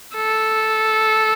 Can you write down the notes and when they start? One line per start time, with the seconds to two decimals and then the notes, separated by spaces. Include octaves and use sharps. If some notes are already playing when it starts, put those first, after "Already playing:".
0.16 A4